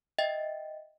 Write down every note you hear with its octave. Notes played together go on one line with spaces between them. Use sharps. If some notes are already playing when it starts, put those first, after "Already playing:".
D#5 E5 G5 A6